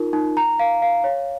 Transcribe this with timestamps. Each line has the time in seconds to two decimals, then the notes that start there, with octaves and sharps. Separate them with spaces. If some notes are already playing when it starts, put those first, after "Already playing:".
Already playing: D#4 F4 A#4
0.13 D#4
0.37 A#5
0.59 F5
0.82 F5
1.04 C#5